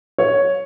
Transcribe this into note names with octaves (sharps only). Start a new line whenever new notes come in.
C#5